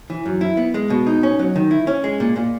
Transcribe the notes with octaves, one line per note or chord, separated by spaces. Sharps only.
E3
F#2
E4
B3
G#3
B2
D#4
C#4
F#3
D#3
E4
C#4
G#3
A#2
A#2